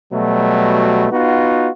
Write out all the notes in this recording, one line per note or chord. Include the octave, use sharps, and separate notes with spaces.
B2 F#3 G3 A3
B3 D#4 F4 F#4